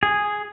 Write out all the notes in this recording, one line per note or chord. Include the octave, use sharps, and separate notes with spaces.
G#4